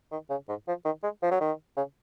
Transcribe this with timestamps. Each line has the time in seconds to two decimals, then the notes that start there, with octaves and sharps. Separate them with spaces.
0.12 D#3
0.30 C#3
0.48 G#2
0.67 F3
0.85 D#3
1.03 G#3
1.22 F3
1.31 F#3
1.40 D#3
1.77 C#3